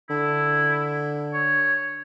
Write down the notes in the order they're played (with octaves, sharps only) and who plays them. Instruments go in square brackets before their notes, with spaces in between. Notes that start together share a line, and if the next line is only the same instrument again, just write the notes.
[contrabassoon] D3 [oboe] E4
[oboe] C#5